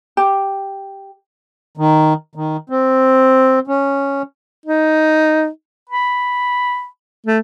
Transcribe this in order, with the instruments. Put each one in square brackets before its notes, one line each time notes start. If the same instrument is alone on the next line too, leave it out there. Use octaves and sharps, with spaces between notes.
[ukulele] G4
[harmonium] D#3
D#3
C4
C#4
[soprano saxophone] D#4
B5
A3